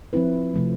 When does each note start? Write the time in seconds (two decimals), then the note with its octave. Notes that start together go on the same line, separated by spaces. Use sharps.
0.13 F3 C4 E4 B4
0.54 C3 F3 A3